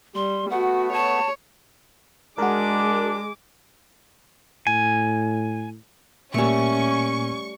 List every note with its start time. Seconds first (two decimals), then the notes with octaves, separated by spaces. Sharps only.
0.15 G3 C6
0.50 A3 B3 F#4 F#5
0.93 C#5 A5
2.38 G#3 D4 F#4 G#4 A#4 D6
4.67 A2 G#5
6.34 A#2 G3 A3 A#3 C#4 G#5 C#6